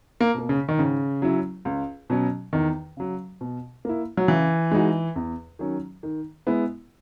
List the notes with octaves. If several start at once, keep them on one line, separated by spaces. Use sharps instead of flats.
A#3
B2 A#3
C#3
D#3
G#2 C#3
F#3 C#4 E4
C#2
B2 F#3 C#4
E2 D#3
C#3 F#3
B2
A#3 E4
F#3
C#3 E3
G#3 D#4 F#4
E2
D#3 F#3 C#4
D#3
G#3 B3 E4